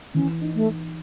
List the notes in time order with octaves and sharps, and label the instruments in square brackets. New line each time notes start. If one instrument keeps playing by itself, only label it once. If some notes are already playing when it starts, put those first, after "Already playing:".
[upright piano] E3 [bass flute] C#4
[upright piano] D#4
[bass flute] A3